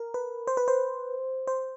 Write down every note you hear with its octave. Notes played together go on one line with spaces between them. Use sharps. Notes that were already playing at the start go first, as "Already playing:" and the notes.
Already playing: A#4
B4
C5
B4
C5
C5